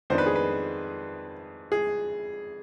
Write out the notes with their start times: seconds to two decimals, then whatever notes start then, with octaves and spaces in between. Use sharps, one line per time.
0.10 F2 D#3 B3 D4 C5
0.18 B4
0.26 G#4
0.36 B4
1.72 G#4